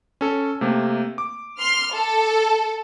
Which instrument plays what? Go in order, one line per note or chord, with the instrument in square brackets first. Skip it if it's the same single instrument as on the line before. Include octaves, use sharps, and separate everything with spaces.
[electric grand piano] C#4 A4
C3 A3 A#3
D6
[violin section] C6 F6
A4